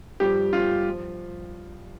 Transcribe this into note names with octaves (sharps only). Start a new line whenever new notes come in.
G2 F3 G4
F4
F3